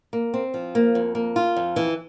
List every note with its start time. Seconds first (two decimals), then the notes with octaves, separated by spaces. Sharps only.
0.13 A#3
0.34 C4
0.54 F3
0.75 A#3
0.95 F2
1.15 A#3
1.36 F4
1.56 F2
1.76 E3